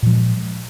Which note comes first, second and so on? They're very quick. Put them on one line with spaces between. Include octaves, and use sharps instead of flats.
A#2 F3 G#3